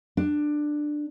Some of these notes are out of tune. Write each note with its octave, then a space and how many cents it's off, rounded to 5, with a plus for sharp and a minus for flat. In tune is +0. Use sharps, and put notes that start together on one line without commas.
D4 +15